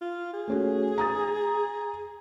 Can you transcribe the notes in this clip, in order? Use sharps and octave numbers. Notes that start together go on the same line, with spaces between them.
F4
G#4
A3 C#4 F#4
A#5 D#6 A6